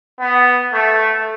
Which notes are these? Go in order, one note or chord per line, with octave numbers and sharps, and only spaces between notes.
B3
A3